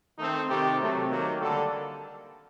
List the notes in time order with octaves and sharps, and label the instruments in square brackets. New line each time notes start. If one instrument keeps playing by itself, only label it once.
[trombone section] D#3 A3 C4 D#4
C3 D#3 A3 C4 G4
C3 F#3 A3 C4
D#3 F#3 A#3
D3 G3 A#3 A4